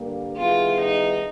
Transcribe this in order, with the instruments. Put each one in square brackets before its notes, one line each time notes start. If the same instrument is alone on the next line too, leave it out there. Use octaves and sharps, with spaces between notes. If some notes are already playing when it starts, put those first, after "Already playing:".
Already playing: [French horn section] G2 D3 G3 A#3
[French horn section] D#3 G3 B3 E4 G#4 [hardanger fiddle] F4
[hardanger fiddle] D#4